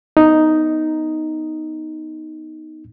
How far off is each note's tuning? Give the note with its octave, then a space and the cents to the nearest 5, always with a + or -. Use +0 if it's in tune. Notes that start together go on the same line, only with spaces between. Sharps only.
B3 -5 D#4 +0